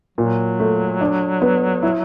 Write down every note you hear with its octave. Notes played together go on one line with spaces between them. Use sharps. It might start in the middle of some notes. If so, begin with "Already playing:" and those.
A#2 F#3
A3
D4
B3
E4